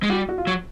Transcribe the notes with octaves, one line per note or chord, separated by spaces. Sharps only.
G#3
G3 F#4
F#4
F4
F#3